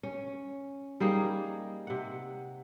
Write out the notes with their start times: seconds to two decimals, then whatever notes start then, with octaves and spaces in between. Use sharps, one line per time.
0.03 C#4
1.00 G3 A#3 D#4 G#4
1.87 C3 F#5